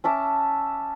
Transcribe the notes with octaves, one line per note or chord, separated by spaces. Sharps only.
C#4 E5 A5 D6